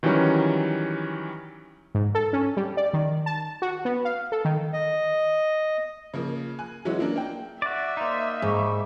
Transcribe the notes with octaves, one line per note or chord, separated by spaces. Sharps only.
D#3 E3 F#3 G3 C#4
G#2
A4
C#4
G3
D5
D#3
A5
F#4
B3
F5
A4
D#3
D#5
C#3 F3 A#3
G#5 F#6
E3 F#3 G#3 C#4 F#4
F#3 A#3 D4 A#4
A#3 A#4 G5
F#4 D5 E5
A#3 D#4 C5 D5
G#2 G3 C#6 D6